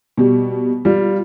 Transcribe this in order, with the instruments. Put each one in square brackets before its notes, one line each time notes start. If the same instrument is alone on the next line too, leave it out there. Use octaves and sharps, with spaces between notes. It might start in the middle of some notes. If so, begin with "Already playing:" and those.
[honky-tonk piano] B2 G3
[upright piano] G3 [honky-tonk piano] F4